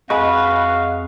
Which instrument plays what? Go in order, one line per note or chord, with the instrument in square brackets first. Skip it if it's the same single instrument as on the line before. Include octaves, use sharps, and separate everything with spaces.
[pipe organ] F2 [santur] G#3 [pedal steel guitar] F#4 B4 [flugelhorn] F5